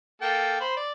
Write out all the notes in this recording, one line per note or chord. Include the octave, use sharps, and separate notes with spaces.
A#3 A4 G5
C5 B5
D5